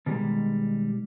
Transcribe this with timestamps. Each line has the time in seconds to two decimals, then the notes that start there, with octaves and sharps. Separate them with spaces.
0.06 B2 D#3 G3 G#3